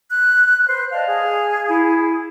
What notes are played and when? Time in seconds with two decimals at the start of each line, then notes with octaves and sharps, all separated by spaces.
0.09 F#6
0.68 B4 C5
0.92 D5 D#5 F5 A5
1.07 G#4
1.69 E4